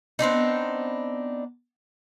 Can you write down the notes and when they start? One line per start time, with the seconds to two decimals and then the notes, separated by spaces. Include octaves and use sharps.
0.19 B3 C4 D4 D#4